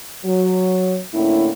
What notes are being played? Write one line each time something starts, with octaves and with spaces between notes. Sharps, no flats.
F#3
A2 D3 A#3 C#4 E4